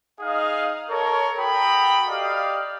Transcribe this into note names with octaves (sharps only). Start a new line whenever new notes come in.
D#4 G#4 D#5 F5
A4 A#4 C#5
F#4 A4 G5 A#5 B5 D#6
G4 D5 D#5 F5